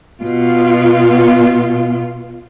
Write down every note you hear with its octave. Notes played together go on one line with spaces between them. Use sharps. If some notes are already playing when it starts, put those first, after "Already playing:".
B2 F4